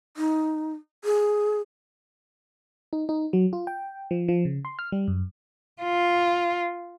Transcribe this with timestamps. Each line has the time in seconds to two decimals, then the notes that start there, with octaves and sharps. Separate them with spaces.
0.17 D#4
1.04 G#4
2.93 D#4
3.09 D#4
3.33 F#3
3.53 F4
3.67 G5
4.11 F3
4.28 F3
4.45 C#3
4.65 C6
4.79 F6
4.92 G3
5.08 F#2
5.82 F4